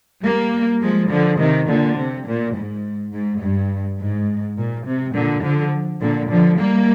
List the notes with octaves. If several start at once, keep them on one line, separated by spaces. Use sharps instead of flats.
G3 A#3
F3 G#3
D3 F3
C3 D#3
A#2 D3
C3
A#2
G#2
G#2
G2
G#2
A#2
C3
A#2 D3
D3 F3
A#2 D3
D3 F3
G3 A#3